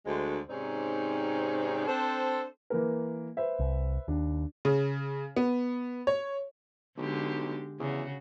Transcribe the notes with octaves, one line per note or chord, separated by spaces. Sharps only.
D2 G#3 C5
G#2 C3 C4 C#4 D#4 D5
C4 D4 A4 C5
E3 A#3 A#4
B4 C5 E5
C2
D#2 D4
C#3
B3
C#5
B1 D3 G#3 G4
E2 C#3 F#4